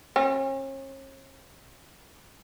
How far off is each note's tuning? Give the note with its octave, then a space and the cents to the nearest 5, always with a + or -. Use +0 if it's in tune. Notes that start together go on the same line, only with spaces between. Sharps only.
C#4 -40